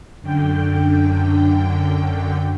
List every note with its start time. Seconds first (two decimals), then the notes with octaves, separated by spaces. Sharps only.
0.21 F#2 D3 G5